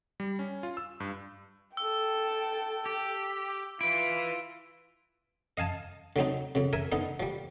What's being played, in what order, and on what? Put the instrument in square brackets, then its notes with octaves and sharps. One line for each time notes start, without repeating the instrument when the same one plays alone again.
[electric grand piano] G3
C#4
F4
E6
G2
[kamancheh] A4 G5 [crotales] E6
[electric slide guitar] G4
[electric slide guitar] E4 B4 [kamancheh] F4 [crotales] D7
[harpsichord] D#5 F5 G#5 A5
D3 F#3 C4 D#4
F2 C#3
A#4 E5 G#5
D3 B3 D#4
F3 G3